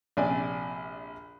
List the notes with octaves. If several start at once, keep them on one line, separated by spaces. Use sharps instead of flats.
A#1 C3 D5 G#5